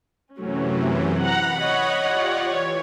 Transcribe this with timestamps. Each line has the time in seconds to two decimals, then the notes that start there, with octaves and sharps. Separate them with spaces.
0.38 F#2 C3 E3 F#3 A3 C#4
1.23 F#5 A#5 B5
1.59 C#5 D#5 F#5
1.99 F4 G4 D5
2.50 E3 C#5